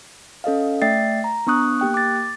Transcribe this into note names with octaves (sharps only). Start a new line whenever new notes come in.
C#4 A4 D#5 F5
A3 D5 E5 G5 A6 C7
A#5
B3 D4 C#6 D#6 F#6
A#3 G4 G5 F#6
D6 A6